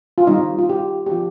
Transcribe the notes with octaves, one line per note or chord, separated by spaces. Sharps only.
F4
D#3 G3 C4 D#4
F4
G4
G4
F3 C4 F4